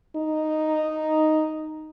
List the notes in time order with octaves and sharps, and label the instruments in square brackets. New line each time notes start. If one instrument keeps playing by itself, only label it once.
[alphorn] D#4